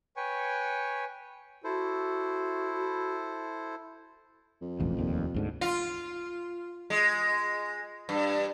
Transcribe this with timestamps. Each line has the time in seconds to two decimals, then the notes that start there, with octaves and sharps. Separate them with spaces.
0.17 B4 C#5 G5 G#5 C#6
1.64 E4 F#4 A4 C5
4.61 F2
4.80 E1 A1 E2
4.97 F1 D#2 A#2
5.34 D2 G#2 D3
5.61 F4
6.90 G#3
8.09 G2